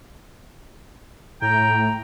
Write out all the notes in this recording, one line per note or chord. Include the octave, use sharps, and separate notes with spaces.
A2 G5 A#5